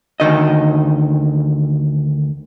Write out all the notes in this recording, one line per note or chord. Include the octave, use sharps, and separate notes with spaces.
D2 D#3 D#5